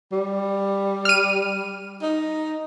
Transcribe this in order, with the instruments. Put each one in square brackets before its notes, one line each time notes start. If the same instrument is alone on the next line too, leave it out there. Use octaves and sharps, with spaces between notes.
[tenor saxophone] G3
[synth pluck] F6 D#7
[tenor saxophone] D#4